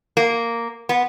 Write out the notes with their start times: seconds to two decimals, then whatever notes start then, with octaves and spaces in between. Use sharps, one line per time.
0.17 A#3
0.89 B3